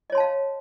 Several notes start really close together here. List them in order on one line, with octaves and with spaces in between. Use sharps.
D#5 C#5 C6 A5 F5